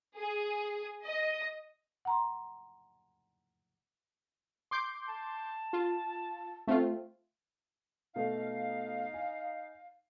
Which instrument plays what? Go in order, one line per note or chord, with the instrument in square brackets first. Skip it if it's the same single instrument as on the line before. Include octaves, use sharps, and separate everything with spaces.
[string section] G#4
D#5
[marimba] F#5 A#5 C6
[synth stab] C6 D6 G6
[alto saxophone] A5
[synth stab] F4
A3 C4 F4
[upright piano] B2 A3 A4 [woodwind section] D#4 F5
[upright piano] G#5